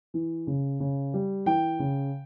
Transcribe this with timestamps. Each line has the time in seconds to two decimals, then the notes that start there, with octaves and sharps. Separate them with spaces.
0.14 E3
0.47 C#3
0.80 C#3
1.14 G3
1.46 E3 G5
1.79 C#3